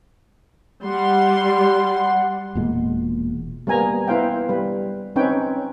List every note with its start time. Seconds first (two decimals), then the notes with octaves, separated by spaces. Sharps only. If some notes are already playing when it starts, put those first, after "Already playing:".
0.84 G3 F#5 C6
2.55 E1 A#2 G#3
3.67 G3 A#3 B3 G#5 A#5
4.08 B3 E4 B4 C5 F5 G5
4.49 G3 B4
5.16 C4 C#4 D#4 B4 C#5 G5